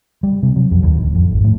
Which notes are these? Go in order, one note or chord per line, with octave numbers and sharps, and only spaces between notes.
G3
C3
F#3
F2
D#2
D1
F2
G#1
A2